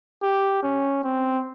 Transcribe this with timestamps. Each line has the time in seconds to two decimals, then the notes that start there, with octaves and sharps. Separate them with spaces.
0.22 G4
0.63 C#4
1.04 C4